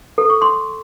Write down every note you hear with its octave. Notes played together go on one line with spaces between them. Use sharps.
A4
C#6
C6